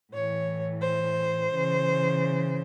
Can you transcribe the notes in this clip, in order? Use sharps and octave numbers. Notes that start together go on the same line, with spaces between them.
A2 E3 C#5
C5
C#3 E3